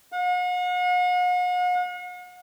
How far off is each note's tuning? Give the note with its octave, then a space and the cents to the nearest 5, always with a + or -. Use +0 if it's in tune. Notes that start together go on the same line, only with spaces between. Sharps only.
F#5 -45